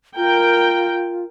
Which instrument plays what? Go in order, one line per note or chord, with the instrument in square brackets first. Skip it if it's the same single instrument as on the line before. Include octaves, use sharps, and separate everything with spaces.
[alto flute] F4 [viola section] A#4 G5